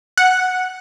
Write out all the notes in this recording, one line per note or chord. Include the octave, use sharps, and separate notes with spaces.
F#5